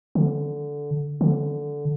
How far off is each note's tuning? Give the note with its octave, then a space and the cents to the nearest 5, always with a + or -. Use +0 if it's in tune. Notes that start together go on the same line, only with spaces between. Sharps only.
D3 -10
D3 -10